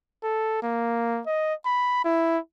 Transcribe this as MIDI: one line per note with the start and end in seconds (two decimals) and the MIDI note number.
0.23 0.62 69
0.63 1.21 58
1.27 1.54 75
1.65 2.03 83
2.05 2.38 64